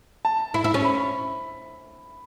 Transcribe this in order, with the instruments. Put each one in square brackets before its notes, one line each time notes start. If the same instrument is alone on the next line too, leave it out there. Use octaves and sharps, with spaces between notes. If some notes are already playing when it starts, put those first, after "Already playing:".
[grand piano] A5
[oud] E4
E4
C#4
[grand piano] B5